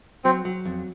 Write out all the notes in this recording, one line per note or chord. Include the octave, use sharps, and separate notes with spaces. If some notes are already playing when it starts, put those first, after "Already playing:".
F#3 C4
F#3
F2